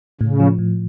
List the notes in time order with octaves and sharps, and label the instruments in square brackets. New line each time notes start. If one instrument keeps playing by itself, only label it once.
[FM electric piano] A2 [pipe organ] C#3
[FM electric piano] F3
A2